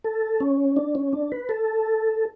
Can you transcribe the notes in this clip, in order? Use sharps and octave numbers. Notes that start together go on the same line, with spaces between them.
A4
C#4
D4
C#4
D4
B4
A4